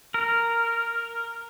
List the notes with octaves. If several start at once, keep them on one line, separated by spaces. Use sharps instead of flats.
A#4